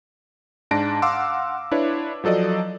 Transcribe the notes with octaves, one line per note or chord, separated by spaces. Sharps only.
G#2 D4 A5 A#6 D7
F5 F#5 C6 D6 E6
D4 E4 B4 C#5
F3 F#3 A4 D5 D#5